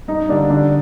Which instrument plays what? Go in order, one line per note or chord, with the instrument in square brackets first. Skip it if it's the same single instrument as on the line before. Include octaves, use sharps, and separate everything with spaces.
[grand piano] G2 [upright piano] D#4
[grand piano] D3 G3 A#3 [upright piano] D4
[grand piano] D3 [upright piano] D4